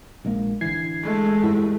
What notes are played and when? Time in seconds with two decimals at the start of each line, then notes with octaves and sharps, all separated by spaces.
0.25 A#1 G#3 A#3
0.61 A1 D3 E3 G#6 C7
1.03 G#3 A3
1.44 G2 E3 E4